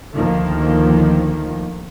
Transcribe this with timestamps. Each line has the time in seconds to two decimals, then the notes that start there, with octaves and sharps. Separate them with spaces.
0.13 D2 D#3 F3 A#3